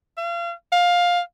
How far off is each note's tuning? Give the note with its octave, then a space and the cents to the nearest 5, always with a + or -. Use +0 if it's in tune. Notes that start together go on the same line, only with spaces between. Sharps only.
F5 -35
F5 +15